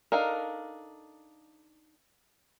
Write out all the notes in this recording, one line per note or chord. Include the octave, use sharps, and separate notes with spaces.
D4 D#4 A4 A#4 F5